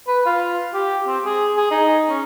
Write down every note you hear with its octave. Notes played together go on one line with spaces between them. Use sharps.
B4
F4
G4
C4
G#4
G#4
D#4
C#4